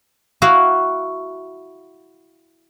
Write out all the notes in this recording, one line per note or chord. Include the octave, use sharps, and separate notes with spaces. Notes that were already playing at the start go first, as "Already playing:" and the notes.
E4 F#4 F5